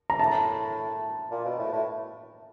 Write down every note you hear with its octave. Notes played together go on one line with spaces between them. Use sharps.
A#5
A2 A5
A#2
B2
A2
A2